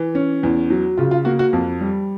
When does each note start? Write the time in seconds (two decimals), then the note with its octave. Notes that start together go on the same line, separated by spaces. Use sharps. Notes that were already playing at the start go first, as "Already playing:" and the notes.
Already playing: E3
0.15 C#4
0.43 E2
0.70 F#3
0.97 C#3 F4
1.11 F4
1.25 A#3 F#4
1.39 F#4
1.53 F2
1.81 G3